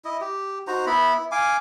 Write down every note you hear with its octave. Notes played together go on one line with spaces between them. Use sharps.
E4 D#5
G4
D#4 F#4 C5 A#5
B3 E4 B5
E4
F5 G#5 D6